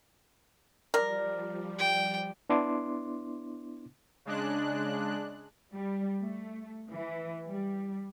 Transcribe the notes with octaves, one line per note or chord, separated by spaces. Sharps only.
F3 G3 A#4 D5
G5
B3 D4 E4 C6 D6
C#3 G#3 D4 F#6
G3
A3
E3
G3